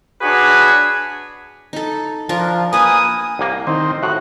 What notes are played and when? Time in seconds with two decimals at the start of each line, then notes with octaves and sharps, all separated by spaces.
0.22 D4 F#4 G#4 B4 C#5
1.73 D#4 A4
2.29 F3 D4 F4 A#4
2.73 A#3 B4 G#5 D#6
3.39 C2 A#3
3.67 D#3 C4
4.03 A2 F#4